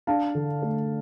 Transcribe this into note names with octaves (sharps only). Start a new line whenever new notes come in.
D4 F5 A5
D3
A3